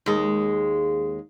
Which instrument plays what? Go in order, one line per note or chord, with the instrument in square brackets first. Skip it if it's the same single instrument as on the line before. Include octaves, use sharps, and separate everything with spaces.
[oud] D#2 G#3